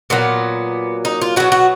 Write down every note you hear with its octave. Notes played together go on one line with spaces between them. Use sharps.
A#2 F#3 B3
D#4
F4
B2 F#3 F#4
F#4